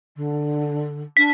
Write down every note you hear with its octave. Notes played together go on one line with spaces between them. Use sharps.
D3
D4 B6